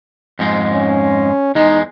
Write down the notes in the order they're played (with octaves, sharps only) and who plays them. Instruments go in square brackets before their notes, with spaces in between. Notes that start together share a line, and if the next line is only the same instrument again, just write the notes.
[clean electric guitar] F2 G#2 G#3
[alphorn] C#4
[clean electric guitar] E2 G#3 [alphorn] D#4